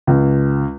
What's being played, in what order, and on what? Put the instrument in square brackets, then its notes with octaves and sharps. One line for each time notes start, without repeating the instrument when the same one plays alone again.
[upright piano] C#2